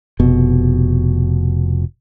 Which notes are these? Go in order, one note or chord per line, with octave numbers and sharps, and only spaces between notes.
F1 B2